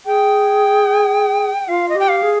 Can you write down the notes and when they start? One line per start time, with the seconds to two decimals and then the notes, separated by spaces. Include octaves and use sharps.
0.06 G#4 G5
1.68 F4 F5
1.89 D#5
1.95 G4 G5
2.09 F5
2.23 G#4